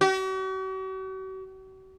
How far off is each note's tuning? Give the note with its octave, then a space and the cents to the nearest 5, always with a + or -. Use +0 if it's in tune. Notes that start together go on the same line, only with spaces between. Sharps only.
F#4 +45